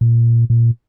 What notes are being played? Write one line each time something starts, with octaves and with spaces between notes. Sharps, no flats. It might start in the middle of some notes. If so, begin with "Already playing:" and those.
A#2
A#2